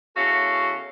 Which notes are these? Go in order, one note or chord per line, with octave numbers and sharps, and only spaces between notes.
E2 C#4 F#4 A4 F5